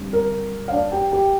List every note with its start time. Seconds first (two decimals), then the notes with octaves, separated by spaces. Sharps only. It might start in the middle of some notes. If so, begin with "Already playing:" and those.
Already playing: D3 G3 C4
0.13 A#4
0.68 F5
0.72 D4 D5
0.92 G4 G5
1.12 G4 G5